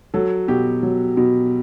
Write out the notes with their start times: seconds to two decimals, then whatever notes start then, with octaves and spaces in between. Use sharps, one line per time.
0.14 F#3 A4
0.48 B2 G4
0.83 F#3
1.17 B2